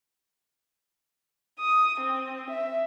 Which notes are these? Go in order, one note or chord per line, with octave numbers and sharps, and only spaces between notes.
D#6
C4
E5